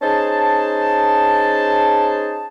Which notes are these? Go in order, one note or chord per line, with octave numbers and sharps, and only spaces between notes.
C#4 D#4 G#4 C5 A5